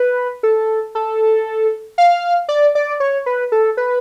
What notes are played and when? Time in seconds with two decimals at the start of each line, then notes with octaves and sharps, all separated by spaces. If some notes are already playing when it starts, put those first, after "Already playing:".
Already playing: B4
0.43 A4
0.95 A4
1.98 F5
2.49 D5
2.75 D5
3.00 C#5
3.26 B4
3.52 A4
3.77 B4